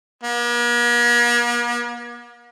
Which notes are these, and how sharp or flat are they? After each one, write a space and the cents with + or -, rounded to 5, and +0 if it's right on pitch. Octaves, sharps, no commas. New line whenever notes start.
A#3 +45